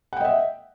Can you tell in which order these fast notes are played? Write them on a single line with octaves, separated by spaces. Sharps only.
F#5 G5 D#5 E5